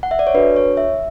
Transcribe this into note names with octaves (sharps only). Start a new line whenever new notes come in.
F#5
E5
D5
C#5
D4 F#4 A4 B4
C#5
E5